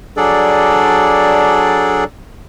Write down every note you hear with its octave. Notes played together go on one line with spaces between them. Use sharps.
F#3 D4 G#4 A4 D5